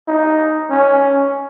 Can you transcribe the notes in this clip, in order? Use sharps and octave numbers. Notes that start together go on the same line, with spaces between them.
D#4
C#4